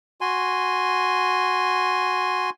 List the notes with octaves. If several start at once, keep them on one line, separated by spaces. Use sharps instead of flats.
F#4 G#5 C6